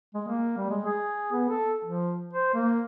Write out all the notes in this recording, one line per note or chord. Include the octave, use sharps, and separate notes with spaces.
G#3
A#3
G3
G#3
G#4
B3
A4
F3
C5
A#3